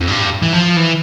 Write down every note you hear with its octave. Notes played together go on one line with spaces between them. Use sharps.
F2
G2
E3
F3
E3